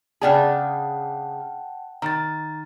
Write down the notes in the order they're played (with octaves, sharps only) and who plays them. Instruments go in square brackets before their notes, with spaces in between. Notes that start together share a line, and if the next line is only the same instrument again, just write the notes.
[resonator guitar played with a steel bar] C#3 D4 G#4 [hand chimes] F#5 G5 A5
[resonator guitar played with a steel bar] D#3 [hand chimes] A#5 A6